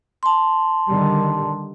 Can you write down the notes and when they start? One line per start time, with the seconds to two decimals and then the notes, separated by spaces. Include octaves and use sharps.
0.23 A5 C6
0.88 D3 D#3 G3